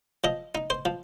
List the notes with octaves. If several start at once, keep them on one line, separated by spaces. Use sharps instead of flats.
F3 D#5
D#4
C5
F3